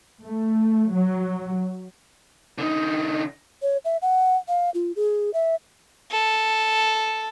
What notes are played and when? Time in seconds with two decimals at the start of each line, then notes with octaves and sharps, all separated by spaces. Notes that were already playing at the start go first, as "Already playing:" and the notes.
0.25 A3
0.92 F#3
2.58 D3 D#4
3.62 C#5
3.85 E5
4.02 F#5
4.48 F5
4.74 F4
4.96 G#4
5.34 E5
6.12 A4